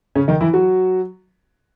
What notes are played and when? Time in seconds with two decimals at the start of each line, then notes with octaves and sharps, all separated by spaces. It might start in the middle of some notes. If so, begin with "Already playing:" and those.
0.16 C#3 C#4
0.28 D#3 D#4
0.41 E3 E4
0.53 F#3 F#4